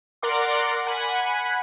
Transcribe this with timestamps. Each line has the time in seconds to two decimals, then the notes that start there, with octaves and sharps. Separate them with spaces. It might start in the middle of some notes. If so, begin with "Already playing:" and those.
0.22 A#4 D5 F#5 C6 D6
0.86 F#5 G#5 B5